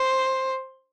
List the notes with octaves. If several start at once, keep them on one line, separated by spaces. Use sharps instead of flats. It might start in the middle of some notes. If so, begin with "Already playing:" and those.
Already playing: C5